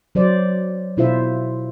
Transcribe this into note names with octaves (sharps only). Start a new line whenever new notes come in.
F#3 C5 D5
B2 E4 F4 C5 E5